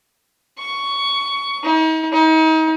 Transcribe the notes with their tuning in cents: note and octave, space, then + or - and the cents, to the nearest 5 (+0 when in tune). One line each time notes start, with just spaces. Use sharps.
C#6 +15
D#4 +40
D#4 +35